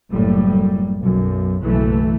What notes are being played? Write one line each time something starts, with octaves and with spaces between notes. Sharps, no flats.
F#1 F#2 A2 G3
B1 F#2
F#1 B1 E3 A3